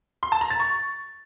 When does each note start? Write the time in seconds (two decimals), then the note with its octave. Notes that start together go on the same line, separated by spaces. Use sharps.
0.23 C6
0.32 A5
0.41 A#5
0.50 A6
0.60 C#6